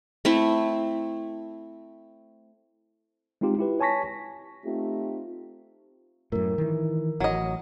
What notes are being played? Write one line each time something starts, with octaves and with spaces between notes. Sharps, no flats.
A3 C4 E4
G#3 C4 D#4 F4 G4
E4 G4 B4
C#5 G#5 A5 C#6 A#6 B6
A3 C4 D#4 F4 G4
F#2 A2 A#4
D#3 E3
A1 F#3 D#5